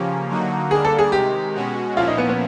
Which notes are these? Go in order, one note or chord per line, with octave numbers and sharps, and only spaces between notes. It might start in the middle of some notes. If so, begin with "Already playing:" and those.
Already playing: C#3 F3 A#3 C#4 G4
D3 F#3 A#3 D#4 F#4
D3 G3 A#3 D4 G#4
A4
G#4
C3 D#3 G#3 G4
B2 G#3 C#4 F#4
A#2 F3 A#3 C#4 E4 F4
D#4
B3
B3